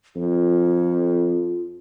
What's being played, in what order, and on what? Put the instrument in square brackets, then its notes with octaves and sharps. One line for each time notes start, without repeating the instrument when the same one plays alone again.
[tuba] F2 [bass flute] F4